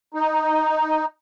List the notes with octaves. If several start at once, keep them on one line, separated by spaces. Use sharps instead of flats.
D#4